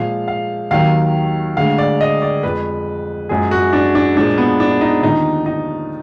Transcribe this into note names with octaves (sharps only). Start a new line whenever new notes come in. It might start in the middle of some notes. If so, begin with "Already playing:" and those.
Already playing: A#2 F3 G#3 F5
F5
D#2 D#3 F#3 F5
D2 D3 G#3 F5
D5
D#5
D5
F2 F3 G#3 B4
F#2 F3 G#3 G#4
F#4
D4
D4
A#2 F3 G#3 D4
B3
D4
D#4
D#2 D3 F3 D#4
D#4